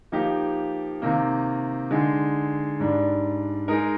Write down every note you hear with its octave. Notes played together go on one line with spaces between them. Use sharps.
F3 A#3 D#4 G4
C3 D#3 A#3
D3 G#3 D#4
G#2 G3 D4
G#3 D#4 A#4